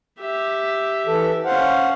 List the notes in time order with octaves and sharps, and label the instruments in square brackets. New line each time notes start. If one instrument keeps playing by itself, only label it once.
[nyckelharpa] G4 E5
[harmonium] E3 A4
[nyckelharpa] C#4 F5 [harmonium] C5 F#5